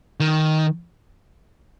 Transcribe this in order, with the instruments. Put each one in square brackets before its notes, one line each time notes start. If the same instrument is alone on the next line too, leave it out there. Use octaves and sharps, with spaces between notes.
[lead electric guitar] D#3